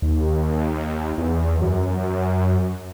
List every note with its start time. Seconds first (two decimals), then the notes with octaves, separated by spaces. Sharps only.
0.02 D#2
1.18 E2
1.61 F#2